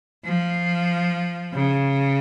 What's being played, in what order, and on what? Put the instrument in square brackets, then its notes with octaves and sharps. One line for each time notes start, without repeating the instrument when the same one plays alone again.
[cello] F3
C#3